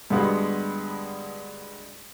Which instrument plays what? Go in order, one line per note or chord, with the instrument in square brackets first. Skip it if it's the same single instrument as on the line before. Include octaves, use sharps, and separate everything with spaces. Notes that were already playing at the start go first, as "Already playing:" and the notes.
[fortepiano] G2 D3 G#3 B3 F#4